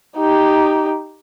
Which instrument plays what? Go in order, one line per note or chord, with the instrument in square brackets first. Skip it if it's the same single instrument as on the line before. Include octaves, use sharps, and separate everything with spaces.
[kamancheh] D#4 G4